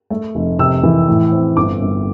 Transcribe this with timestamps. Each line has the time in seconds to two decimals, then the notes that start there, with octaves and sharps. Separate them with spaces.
0.10 A3
0.35 F1
0.59 C3 E6
0.83 E3
1.08 A2
1.32 C4
1.57 G1 D6
1.81 G1